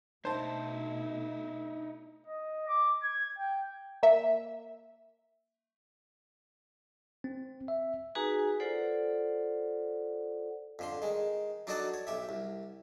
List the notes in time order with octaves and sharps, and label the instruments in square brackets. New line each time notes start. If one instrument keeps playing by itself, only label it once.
[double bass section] B2 A3 [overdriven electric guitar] D#4 E4 [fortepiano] C5 A5
[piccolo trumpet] D#5
D6
G#6
G5
[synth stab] A#3 E5
[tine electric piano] C4
E5
[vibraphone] D#4 F#4 G#4 B4 G#5 A#5
F4 A4 C5 D5 F#5
[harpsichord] F2 D3 C6
D#3 G#3
F#3 D4 D#4 F#4 A4 D5
C#5
B1 G4 E5
C2